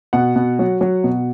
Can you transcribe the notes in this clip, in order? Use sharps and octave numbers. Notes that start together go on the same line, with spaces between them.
B2 F#5
B2
F#3
F#3
B2